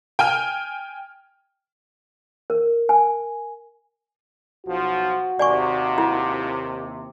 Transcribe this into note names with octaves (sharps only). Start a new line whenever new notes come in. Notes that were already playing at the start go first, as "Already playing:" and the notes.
G5 G#5 F6
A#4
G#5
B1 F3 F#4
D#2 C3 D5 G#5 C#6
E4